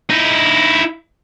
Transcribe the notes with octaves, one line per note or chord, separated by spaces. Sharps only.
D#4 E4